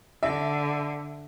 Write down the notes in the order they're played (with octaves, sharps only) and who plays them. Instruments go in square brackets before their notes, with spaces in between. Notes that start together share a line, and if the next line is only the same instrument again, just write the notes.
[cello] D3 [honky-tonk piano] E5